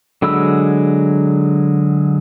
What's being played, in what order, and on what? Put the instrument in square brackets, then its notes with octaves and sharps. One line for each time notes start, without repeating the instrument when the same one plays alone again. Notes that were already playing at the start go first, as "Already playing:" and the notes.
[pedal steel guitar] D3 F#3 G#3 B5 E6